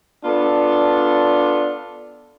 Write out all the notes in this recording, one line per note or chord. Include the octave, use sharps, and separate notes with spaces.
B3 D4 F4 A4 D5